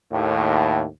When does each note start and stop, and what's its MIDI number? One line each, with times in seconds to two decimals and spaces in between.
0.12 0.85 39
0.12 0.85 45